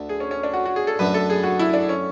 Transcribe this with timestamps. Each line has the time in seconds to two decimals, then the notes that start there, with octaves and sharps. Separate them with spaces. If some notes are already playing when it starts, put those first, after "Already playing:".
Already playing: D2 D3 A3
0.09 G#4
0.20 C#4
0.31 C#4
0.43 D4
0.53 F#4
0.65 F#4
0.76 G#4
0.87 A4
0.99 F#2 D3 A3 B4
1.14 A4
1.30 G#4
1.43 F#4
1.59 E4
1.74 D4
1.89 C#4